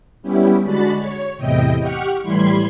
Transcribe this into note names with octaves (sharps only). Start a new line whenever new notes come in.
G3 B3 C#4 E4 G4
D3 G#3 D4 F#4 B5 A6
C#5
E2 A2 C3 E4 D#5 G5
G4 F#5 C#6 F6
A2 E3 G3 B5 C6 G#6